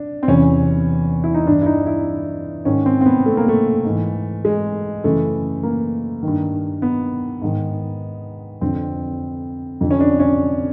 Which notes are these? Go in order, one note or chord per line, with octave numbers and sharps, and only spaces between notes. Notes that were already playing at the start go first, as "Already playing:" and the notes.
Already playing: D4
C4
E2 C3 E3 C#4
E4
D#4
G2 E3 D4
E4
D#4
E4
G#2 D#3 C#4
C4
C4
B3
A3
A#3
A3
G#2 E3
G#3
F#2 C#3 E3 A3
A#3
G2 D#3
B3
G#2 D#3
F2 D3 C4
F2 D3
C#4
D4
C#4